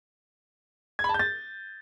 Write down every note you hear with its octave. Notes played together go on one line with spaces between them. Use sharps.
G#6
B5
A5
G6
A6